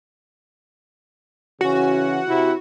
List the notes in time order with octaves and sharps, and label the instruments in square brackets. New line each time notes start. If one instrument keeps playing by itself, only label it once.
[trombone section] C#3 E3 C#4 [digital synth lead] F#4
[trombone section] C3 E4